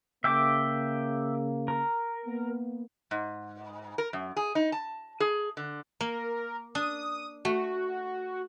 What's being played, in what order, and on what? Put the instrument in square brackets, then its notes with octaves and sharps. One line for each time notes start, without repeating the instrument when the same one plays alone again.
[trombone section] C#3 A#3 [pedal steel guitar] E5 G5 D6
[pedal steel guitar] A#4
[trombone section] A#3 B3
[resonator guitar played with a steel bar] G#2
A#4
F#2
G#4
D#4
A5
G#4
D3
[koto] A#3 [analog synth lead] A#4
[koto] D4 [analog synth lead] D#6
[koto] A3 [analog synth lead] F#4